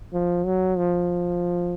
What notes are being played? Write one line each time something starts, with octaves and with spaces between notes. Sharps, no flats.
F3
F#3
F3